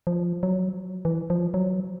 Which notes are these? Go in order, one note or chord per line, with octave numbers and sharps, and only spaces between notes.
F3
F#3
E3
F3
F#3